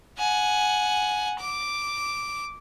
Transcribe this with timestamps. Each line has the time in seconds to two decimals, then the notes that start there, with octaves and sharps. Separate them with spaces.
0.19 F#5 G#5
1.39 D6